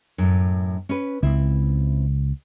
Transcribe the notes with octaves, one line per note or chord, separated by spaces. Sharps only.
F#2 A2
C#4 B4
C#2 C4 E4